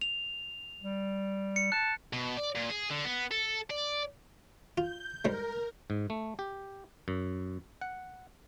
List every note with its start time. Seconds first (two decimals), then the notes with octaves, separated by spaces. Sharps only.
0.01 F7
0.82 G3
1.56 C#7
1.72 A5 F#6
2.13 B2
2.37 D5
2.56 A#2
2.70 G#4
2.91 D3
3.05 B3
3.31 A4
3.70 D5
4.78 F4 G6
5.25 G#2 G3 G#3 A#4
5.90 G#2
6.10 A3
6.39 G4
7.08 F#2
7.81 F#5